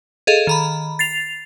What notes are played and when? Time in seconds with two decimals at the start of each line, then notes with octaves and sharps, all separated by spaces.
0.27 G#4 A4 D#5 F5
0.47 D#3 A#5 B5
0.99 A6 C7 F7